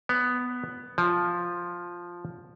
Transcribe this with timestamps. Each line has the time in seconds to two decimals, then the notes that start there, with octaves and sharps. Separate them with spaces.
0.09 B3
0.98 F3